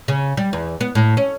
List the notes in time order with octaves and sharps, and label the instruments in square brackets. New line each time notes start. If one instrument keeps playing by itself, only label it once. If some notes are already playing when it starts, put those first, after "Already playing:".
[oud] C#3
G3
E2
B3
A2
C#4